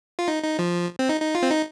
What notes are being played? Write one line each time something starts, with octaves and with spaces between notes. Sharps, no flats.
F4
D#4
D#4
F3
C4
D#4
D#4
F4
C4
D#4